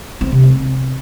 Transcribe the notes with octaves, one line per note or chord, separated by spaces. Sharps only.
C4
C3
C4